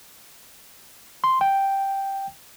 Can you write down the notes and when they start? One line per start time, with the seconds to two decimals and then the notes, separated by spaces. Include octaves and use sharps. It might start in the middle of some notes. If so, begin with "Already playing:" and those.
1.24 C6
1.41 G5